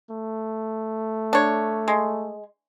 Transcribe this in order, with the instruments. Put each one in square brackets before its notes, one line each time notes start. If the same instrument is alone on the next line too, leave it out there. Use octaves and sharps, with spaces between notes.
[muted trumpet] A3
[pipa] D4 C#5
G#3